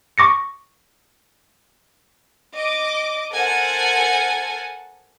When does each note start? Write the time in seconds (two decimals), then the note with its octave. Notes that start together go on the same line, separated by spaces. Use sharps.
0.18 C#6 D6 A#6 C#7
2.54 D#5 D6
3.33 A4 A#4 C5 F#5 G#5 A5